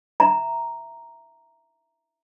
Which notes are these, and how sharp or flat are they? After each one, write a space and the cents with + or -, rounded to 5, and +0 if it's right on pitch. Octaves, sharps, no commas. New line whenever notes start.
E5 +0 A#5 +0